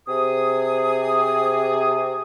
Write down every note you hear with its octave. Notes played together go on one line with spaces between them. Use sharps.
C3 G#4 D#6